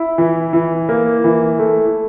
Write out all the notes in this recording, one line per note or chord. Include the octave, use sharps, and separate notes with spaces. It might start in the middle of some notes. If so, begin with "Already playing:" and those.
Already playing: E4
E3
E3
A#3
E3
A3